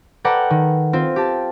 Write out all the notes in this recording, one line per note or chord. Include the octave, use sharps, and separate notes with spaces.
A4 B4 D5 F#5 G5 A#5
D#3
C4 F4
G4 A5